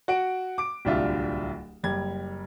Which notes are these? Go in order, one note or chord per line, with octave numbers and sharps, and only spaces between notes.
F#4 F#5 D7
D6 D7
D1 C2 D4 F4 E5
F#1 G3 G#6